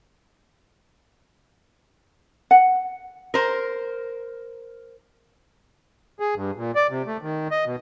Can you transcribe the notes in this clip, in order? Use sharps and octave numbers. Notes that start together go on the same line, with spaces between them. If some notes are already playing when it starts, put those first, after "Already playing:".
F#5
A#4 C5
G#4
G2
A#2
D5
C3
A3
D#3
D#5
B2